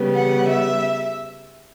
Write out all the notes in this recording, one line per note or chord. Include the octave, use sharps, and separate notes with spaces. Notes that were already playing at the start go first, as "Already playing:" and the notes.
Already playing: C#3 G3 B3
F#5
E5